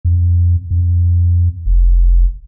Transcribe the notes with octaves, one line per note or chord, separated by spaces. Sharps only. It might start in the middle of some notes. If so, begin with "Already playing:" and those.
F2
F2
F1